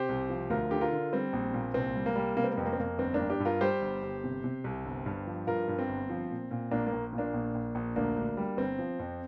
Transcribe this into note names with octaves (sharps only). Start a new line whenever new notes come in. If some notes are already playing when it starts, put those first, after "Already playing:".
Already playing: C3 G4 C5
C2
F3
D2 F4 A#4
D3 G4
F4 A#4
D3
G3 C4
A#1
A#2
C2 C4
G3
A#3
G3
C3 A#3
C4
A#3
F2 C4
A#3
C4
F2 A#3
G1 C4
A#3 D4
G2
D4 G4
G2
F4 A#4
G3 G4 C5
G1
G1
C3
C3
C2
G1
G2
F3
G2 F4 A#4
G2
C4
G1
F3
A#2
A#2
A#1 A#3 D4
A#3
A#1
A#2
A#3 D4
A#1
A#1
A#1
D2 A#3 D4
D2
G3
G1 C4
F3
F2